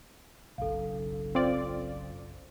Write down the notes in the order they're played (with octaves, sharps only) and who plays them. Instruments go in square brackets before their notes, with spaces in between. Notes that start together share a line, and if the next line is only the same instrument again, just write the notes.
[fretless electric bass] F#1 B1 [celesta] A4 F5
[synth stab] C4 F4 D5